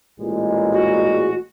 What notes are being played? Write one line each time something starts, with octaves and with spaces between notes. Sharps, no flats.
A1 A#2 G#3
F#4